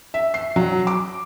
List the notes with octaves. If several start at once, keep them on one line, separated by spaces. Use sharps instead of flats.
E5
C7
F#3
D6